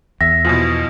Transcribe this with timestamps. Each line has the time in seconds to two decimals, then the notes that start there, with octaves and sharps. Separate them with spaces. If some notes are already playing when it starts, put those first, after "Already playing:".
0.21 E2 E5 A#6
0.45 B2 E3 F3